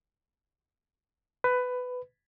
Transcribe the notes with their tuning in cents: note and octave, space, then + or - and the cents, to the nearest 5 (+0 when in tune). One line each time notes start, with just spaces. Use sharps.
B4 +15